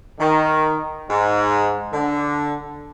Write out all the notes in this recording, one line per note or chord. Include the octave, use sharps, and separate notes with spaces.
D#3
G#2
D3